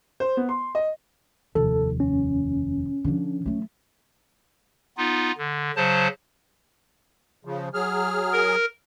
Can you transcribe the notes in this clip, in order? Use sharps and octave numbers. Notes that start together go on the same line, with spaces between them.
C5
B3
C6
D#5
F1 D#2 A4
C#4
D3 F3
F#3 A3
B3 D#4 F4
D3
C#3 F#3 C5 A5
C#3 F3
F#3 G#4 F6
A#4